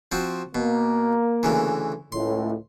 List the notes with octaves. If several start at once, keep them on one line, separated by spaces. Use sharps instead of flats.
F3 C4 F#4
B2 A#3
D2 C#3 E3
C#2 A2 C6